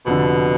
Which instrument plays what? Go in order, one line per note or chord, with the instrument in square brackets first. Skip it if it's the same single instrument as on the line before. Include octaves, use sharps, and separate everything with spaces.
[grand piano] F1 F2 D3 [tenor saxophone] B2